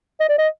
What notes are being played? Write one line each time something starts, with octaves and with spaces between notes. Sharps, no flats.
D#5
D5
D#5